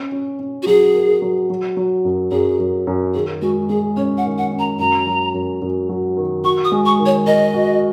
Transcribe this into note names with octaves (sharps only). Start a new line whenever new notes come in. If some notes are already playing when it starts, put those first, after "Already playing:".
Already playing: C#4
C#4
C#4
F#4
F#3 G#4
A#4
F#3
F#3
F#3
F#2
F#2 G#4
F#2
F#2
D#3 G#4
G#3 F#4
G#3 G#4
C#4 C#5
F#5
D#3
F#5
C#4
A#5
F#2 A#5
F#3
F#2
F#2
F#3
D#3
F#4 C#6
D#6
G#3
C#6
D#3
C#5
A#4 D#5
F#4